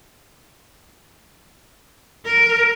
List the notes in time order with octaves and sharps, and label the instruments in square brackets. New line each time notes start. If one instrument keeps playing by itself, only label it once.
[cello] A#4